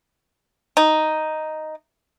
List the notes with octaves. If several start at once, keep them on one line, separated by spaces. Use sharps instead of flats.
D#4